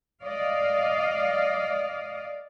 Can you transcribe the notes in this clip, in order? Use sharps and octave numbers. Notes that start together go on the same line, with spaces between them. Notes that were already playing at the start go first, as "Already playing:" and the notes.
D5 D#5 F5